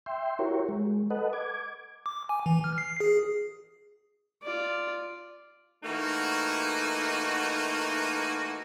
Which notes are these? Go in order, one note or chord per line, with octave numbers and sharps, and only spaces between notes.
E5 G5 C6
E4 F#4 G4 A#4 C#5
G#3
A4 B4 D#5 F#5
D6 G#6
D6
G#5
E3
F6
C7
G#4
F4 D5
E3 A3 A#3 D#4 F#4